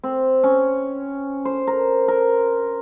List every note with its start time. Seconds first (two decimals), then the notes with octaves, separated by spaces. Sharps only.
0.03 C4
0.44 C#4
1.45 C5
1.67 A#4
2.08 A#4